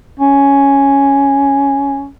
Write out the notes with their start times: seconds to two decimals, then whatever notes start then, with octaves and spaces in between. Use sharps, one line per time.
0.20 C#4